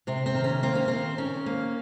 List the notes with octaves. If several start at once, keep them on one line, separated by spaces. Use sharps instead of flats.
C3 C4
C4
D#3
C#4
A#3 C4
C#4
D#3 C4
D#3 C#4
A#3